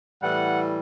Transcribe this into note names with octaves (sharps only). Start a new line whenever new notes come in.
A2 E3 G3 F#5